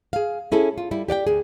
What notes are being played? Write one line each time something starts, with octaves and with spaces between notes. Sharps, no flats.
G#4 F5
C#4 E4 G#4 A4
F4
G3 E4
G4 D5 F#5 G5
D2 G#4